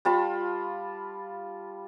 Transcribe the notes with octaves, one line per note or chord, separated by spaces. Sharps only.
G3 F4 A5 B5